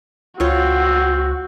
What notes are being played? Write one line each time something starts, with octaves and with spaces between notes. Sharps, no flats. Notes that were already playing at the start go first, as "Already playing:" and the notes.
C#2 C4 F4 F#4 C#5